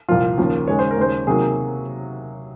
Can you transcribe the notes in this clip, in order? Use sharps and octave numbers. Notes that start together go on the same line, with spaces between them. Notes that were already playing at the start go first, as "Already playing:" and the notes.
C2 A#2 F3 F4
D#2 C#3 F3 A#3
D#2 C#3 G#3 C#5
C5
A#4
D#2 C#3 G#3 C5
C3 D#3 F#3 A#3 G#4